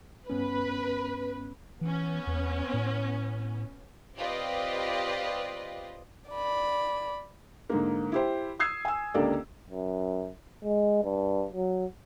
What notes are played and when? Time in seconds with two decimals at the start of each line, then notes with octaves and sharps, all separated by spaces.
0.30 G2 B3 C#4 B4
1.81 E3 B3 C#4
2.27 E2
2.74 A2
4.16 C4 F4 G4 B4 D5 D#5
6.29 D5 B5
7.70 G#2 D3 A#3
8.12 E4 G4 C5
8.59 D#6 E6 G#6 C7
8.85 G#5 E6
9.14 C#2 D3 A#3 G4 A4 D5
9.70 F#2
10.64 G#3
11.04 G2
11.53 F#3